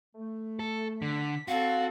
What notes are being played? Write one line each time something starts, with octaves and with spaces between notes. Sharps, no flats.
A3
A4
D3 B6
C4 F#4 A4 F5